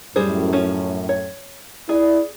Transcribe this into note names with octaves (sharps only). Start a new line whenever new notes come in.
F#2 A2 G3 G#4 C5
F3 C#4
C#5
E4 G#4 D5